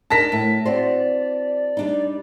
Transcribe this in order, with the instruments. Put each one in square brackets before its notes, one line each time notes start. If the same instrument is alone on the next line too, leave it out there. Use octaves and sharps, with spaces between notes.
[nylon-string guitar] D4 D#4 A#4 [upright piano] A5 A#6 B6
[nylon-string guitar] A2
[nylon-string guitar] C4 F#4 C5 [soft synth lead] D5
[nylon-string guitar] G3 D4 D#4